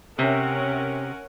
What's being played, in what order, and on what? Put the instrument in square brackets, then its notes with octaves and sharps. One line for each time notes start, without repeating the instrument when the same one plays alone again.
[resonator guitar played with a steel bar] C3 [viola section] C#4 A#4 F#5